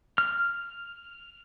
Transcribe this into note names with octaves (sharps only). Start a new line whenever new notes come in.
F6